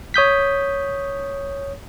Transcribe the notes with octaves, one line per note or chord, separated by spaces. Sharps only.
C#5 D#6 G6 B6